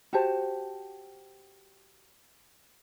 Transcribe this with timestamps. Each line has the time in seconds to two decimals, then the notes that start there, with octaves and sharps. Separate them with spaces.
0.13 F#4 G4 C5 A5